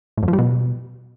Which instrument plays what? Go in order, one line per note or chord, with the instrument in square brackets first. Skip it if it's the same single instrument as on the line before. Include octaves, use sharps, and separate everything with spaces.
[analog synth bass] A2
F#2
F3
G3
B2